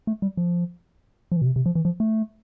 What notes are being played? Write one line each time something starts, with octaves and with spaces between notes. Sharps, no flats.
A3
G3
F3
F3
E3
B2
C3
C3
F3
E3
F3
A3